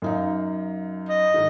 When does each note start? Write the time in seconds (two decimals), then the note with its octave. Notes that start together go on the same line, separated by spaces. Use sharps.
0.02 F#2 D#4 F5
1.09 D#5
1.34 G#2 D#3